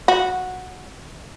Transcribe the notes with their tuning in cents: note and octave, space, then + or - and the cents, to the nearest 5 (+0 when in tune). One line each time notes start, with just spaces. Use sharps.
F#4 -10